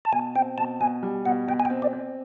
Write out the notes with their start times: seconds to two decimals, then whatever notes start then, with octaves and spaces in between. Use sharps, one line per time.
0.05 A5
0.12 B2 G#5
0.35 C4 G5
0.58 B2 A5
0.80 B2 G#5
1.03 G3
1.25 B2 F#5
1.48 B2 G5
1.60 G#5
1.65 G5
1.70 C4
1.82 D5
1.93 C4